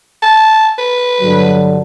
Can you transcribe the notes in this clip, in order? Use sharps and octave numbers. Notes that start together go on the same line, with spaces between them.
A5
B4
G2 D3 F#3